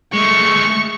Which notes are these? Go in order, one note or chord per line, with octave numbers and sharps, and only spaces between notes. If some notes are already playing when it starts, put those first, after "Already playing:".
G#3 A3 C#6